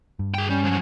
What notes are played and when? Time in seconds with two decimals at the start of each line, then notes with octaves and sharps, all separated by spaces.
0.19 G2
0.35 G#4 G5
0.49 G3 C#4
0.64 F3 F#3